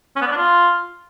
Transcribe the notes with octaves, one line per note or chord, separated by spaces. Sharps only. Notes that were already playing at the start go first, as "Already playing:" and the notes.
C#4
B3
D5
D4
F4